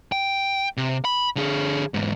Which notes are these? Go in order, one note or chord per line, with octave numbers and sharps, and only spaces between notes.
G5
C3
B5
D3 G#4
E2 G#2